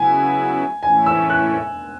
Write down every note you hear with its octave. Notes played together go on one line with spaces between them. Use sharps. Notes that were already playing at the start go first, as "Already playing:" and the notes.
Already playing: C#3 F#3 B3 E4 G#5
A2 E3 A3 C#4 E4 G#5
E6
F#6